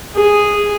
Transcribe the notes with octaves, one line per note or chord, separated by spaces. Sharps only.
G#4